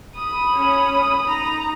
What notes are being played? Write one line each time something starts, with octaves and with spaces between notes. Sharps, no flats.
B5 D#6
C#4 C#5
D#4 A#5